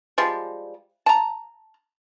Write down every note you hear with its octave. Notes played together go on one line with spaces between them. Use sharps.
F3 G3 G#3
A5 A#5